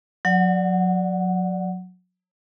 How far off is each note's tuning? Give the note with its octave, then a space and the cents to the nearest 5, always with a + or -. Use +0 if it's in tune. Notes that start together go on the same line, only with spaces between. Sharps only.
F#3 -25 D5 +0 F#5 +0